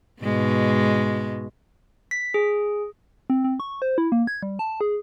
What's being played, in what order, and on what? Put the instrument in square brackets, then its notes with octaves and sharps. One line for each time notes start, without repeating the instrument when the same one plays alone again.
[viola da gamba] G#2 B2 G#3
[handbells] B6
G#4
[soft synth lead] C4
C4
C#6
C5
E4
A#3
G#6
G3
A5
G#4